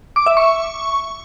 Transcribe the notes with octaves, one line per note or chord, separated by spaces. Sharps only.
D6
E5
C#6